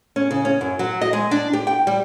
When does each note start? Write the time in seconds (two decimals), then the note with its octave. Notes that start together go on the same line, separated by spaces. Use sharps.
0.16 C#4
0.31 C#3
0.45 C#4
0.61 F#2
0.79 F#3
1.01 D#5
1.13 G#3
1.31 D4
1.53 G4
1.67 G5
1.87 G3